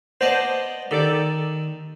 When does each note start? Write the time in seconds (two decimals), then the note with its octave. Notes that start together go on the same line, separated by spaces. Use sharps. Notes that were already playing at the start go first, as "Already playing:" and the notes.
0.21 B3 C5 D5 D#5 A5
0.91 D#3 G4 A4 D5